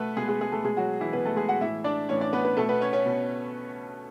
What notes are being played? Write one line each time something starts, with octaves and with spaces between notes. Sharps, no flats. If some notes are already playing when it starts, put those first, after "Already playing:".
Already playing: B2 A3 B3 A4 B4
B2 G#3 G#4
G#3 G#4
G#3 G#4
A3 A4
B2 G#3 G#4
F#3 F#4
E3 E4
B2 B3 B4
A3 A4
G#3 G#4
F#4 F#5
A2 E3 E4 E5
D4 D5
A2 E3 C#4 C#5
D4 D5
B3 B4
B3 B4
B2 A3 A4
B3 B4
C#4 C#5
C#4 C#5
B2